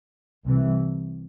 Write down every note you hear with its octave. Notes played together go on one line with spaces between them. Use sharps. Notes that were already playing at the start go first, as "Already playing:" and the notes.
C2 C3 E3